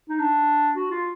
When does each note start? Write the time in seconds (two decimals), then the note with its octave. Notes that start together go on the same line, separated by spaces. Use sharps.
0.09 D#4
0.20 D4
0.76 F#4
0.91 F4